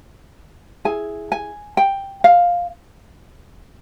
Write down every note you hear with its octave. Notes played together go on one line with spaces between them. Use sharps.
E4 G#4 G#5
G#5
G5
F5